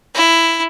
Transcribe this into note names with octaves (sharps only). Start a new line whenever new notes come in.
E4